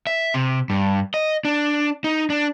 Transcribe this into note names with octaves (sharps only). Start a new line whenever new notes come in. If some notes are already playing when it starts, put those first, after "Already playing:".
E5
C3
G2
D#5
D4
D#4
D4